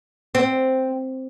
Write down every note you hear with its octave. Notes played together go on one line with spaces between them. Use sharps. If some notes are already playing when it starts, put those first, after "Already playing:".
C4